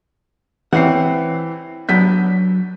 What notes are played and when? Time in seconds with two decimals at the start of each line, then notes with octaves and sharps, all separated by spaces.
0.73 E3 C4 C#5 F#5 C7
1.89 F#3 B3 D4 G6 B6